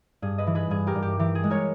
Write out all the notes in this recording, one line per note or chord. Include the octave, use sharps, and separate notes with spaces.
G2 G#4
B4 D#5
E3
G#4 B4
G2 G#4
G4 A#4
G2
G4
E3 G4
G#4
G#3
A#4 C#5